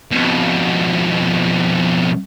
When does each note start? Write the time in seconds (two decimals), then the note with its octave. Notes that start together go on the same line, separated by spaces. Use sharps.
0.11 F2 B2